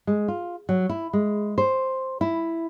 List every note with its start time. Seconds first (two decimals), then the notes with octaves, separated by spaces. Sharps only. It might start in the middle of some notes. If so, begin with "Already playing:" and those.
0.07 G#3
0.28 F4
0.69 F#3
0.89 E4
1.13 G#3
1.58 C5
2.21 E4